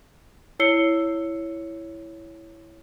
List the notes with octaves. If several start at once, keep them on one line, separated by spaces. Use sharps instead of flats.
E4 C#5 E6 C7 C#7 G7